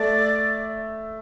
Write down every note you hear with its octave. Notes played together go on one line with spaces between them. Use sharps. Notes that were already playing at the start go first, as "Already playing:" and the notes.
Already playing: A3 D5